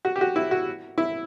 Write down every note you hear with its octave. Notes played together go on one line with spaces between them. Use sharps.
F#4
G4
F#4
E4
F#4
E4